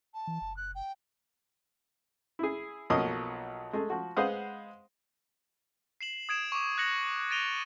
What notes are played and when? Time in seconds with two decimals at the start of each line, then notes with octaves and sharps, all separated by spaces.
0.14 A5
0.27 E3
0.42 F#1
0.56 F#6
0.75 G5
2.39 E4 G#4
2.90 B1 F3 F#3 A#3 D#5 D#6
3.73 G#3 A3
3.90 F3 F#4
4.17 G#3 B4 C5 F5 F#5 D#6
6.01 C7 E7 F#7
6.29 D#6 G#6 D7 E7
6.52 C#6 D6
6.78 F#6 G#6 A#6 C#7 F#7
7.31 A6 A#6 D7 D#7 F7 G7